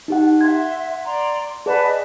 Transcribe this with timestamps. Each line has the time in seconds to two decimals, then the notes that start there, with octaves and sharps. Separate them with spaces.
0.08 D#4 G4 F#5
0.41 E5 F#5 C6 G#6
1.06 D5 A#5 C6
1.66 G#4 B4 D5 F#5 A5
1.83 D#5